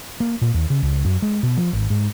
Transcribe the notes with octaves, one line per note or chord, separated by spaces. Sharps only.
A#3
A#2
D#2
C#3
C#2
F#2
G#3
B2
F3
G#1
G#2